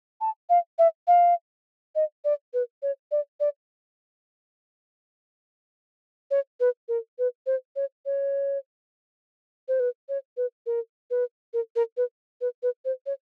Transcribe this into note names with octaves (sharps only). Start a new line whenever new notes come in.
A5
F5
E5
F5
D#5
D5
B4
C#5
D5
D5
C#5
B4
A#4
B4
C5
C#5
C#5
C5
B4
C#5
B4
A#4
B4
A#4
A#4
B4
B4
B4
C5
C#5